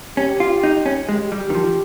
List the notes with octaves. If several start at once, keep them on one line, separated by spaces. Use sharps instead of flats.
C#4 G4
F4
D#4
C#4
G#3 G4
G3
D#3
F3